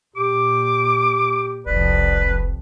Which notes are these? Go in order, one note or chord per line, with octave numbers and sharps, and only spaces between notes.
A#2 G4 D6
F1 C2 F2 B4 D5